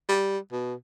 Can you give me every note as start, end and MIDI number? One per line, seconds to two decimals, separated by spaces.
0.09 0.38 55
0.52 0.74 47